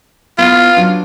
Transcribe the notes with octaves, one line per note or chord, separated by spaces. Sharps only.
B3 E4 F4
F#3 D4